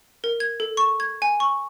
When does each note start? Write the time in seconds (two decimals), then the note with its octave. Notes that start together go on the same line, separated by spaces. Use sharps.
0.24 A#4
0.40 G#6
0.60 A4
0.77 C#6
1.00 G#6
1.22 G#5
1.40 C#6